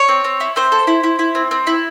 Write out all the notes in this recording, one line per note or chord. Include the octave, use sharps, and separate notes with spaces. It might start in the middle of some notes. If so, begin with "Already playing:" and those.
Already playing: C#5
C4
C4
E4
C4 C5
A4
E4
E4
E4
C4
C4
E4